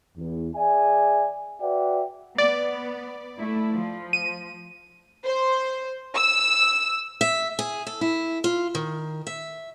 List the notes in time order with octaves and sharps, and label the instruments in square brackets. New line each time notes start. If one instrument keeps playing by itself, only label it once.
[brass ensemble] E2
G#4 D5 E5 G#5
F#4 B4 D5 E5 F#5 G5
[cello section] B3 [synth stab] D5
[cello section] A3 E4
F3
[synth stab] D#7
[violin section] C5
E6
[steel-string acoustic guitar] E5
G#4
A4
E4
F4
D#3
E5